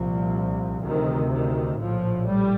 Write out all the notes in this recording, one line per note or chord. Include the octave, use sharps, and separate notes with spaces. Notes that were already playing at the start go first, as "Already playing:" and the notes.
Already playing: C2 A#2 F3
D2 C3 D#3
D#3
A#1 A2 F3
G3